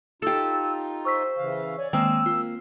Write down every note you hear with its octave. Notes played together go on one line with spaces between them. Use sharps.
D#4 F4 G4 A4 E6
C5 C#6 E6 B6
C#3 E3 F5
C#5 D5 G#5
D#3 G#3 A#3 C4 E6
A#3 F4